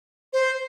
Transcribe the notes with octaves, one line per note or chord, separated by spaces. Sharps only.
C5